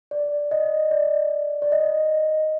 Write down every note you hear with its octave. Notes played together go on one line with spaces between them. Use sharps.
D5
D#5
D5
D5
D#5